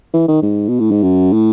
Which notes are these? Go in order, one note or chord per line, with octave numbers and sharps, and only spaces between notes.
E3
D#3
G#2
B2
A2
G#2
F#2
A2